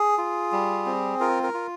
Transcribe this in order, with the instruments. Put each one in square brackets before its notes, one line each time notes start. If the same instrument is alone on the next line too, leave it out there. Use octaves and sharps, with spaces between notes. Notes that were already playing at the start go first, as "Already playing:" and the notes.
Already playing: [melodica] G#4
F4
G3
C4
F4 A#4
A#4
F4